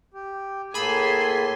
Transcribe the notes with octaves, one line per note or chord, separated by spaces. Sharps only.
G4
A2 A#3 G#4 G#5 A5 B5 C6 E6